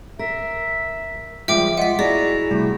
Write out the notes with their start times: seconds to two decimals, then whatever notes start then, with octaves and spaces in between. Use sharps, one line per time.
0.19 A#4 E5
1.48 F3 G3 G#3 F4 E5 G5 D6
1.78 F4 D#5 F#5 B6
1.99 E4 F#4 G#4 D5 A#5
2.51 C3 G3 A3